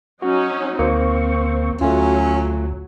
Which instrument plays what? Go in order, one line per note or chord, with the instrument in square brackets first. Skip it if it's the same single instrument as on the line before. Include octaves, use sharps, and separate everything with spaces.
[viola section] F#3 C#4 D#4 [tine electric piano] F#4
[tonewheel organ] D2 C#6 [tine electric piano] A#3 C5 [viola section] C4
[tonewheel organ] D2 [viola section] F#3 [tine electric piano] A3 F4 [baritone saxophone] C#4